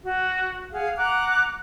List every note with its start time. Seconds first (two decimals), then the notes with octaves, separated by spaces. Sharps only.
0.03 F#4
0.73 G#4 F5 F#5
0.97 F#5 A#5 D6 F#6